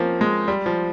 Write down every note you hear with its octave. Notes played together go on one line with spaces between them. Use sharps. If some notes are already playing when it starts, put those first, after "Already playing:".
Already playing: F3 A#3 C4 C#4
G#3
G3
F3